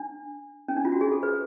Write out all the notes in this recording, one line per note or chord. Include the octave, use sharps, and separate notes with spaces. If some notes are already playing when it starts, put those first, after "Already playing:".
Already playing: D4
C#4
D4
F4
F#4
G#4
A4
B4